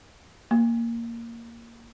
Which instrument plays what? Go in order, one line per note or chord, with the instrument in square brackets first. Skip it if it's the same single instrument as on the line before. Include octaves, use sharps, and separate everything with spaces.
[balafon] A#3